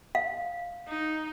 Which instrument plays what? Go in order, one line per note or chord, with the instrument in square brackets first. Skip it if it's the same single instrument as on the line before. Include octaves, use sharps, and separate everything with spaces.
[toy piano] F5
[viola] D#4